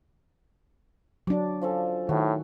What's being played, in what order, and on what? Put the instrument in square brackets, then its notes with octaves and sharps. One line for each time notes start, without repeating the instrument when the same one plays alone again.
[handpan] F#3 D4 [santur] D6
[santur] F3 C#4 A4
[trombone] A2 [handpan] D#3 [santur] F#4